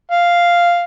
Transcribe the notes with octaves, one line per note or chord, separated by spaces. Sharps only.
F5